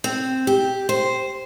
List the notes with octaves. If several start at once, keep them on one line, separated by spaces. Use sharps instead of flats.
C4
G4
C5